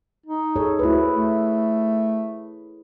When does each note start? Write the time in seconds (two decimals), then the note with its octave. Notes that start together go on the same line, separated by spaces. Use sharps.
0.26 D#4
0.56 G#4 A4 C#5
0.79 D2 E4 B4
1.13 A3